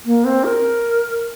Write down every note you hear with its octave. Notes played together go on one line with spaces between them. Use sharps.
A#3
C4
A#4